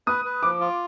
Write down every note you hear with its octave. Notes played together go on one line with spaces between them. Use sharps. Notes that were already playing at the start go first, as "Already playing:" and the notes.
B4 D#6
B4
F3 D6
F4